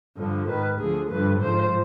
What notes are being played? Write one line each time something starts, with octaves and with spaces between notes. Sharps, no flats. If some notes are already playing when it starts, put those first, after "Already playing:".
G2 D3 F3
G#2 D#3 B4
D2 D3 F3 G#4
G2 D3 F3 B4
G#2 F3 C5